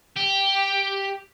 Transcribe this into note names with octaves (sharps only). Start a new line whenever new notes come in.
G4